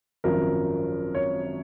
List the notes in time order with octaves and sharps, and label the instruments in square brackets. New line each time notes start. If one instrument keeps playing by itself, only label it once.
[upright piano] G#1 F#2 F3 A#4
C#5